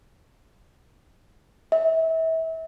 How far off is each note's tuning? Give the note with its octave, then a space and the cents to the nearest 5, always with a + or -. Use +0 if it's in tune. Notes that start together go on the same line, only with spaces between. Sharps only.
E5 -30